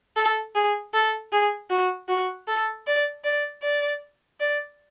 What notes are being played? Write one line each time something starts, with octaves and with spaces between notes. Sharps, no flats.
A4
G#4
A4
G#4
F#4
F#4
A4
D5
D5
D5
D5